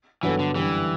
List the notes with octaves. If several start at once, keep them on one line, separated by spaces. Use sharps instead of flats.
G2 E3 F#3 B3 F#4 A4
D3
F#2 D3 E3 G3